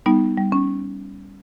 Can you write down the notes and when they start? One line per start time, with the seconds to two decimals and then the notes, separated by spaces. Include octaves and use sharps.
0.06 G3 B3 D#4
0.37 G3
0.52 C#4